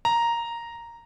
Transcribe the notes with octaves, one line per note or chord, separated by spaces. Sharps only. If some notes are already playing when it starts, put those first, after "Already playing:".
A#5